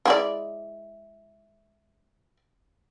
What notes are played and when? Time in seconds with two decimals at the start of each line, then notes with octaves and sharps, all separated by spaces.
0.06 G#3 E4 D5